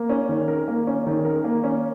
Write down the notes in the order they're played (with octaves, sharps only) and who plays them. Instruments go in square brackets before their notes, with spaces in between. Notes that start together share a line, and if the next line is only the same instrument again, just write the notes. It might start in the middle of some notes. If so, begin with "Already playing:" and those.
Already playing: [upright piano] A#3
C#4
D#3
A#4
A#3
C#4
D#3
A#4
A#3
C#4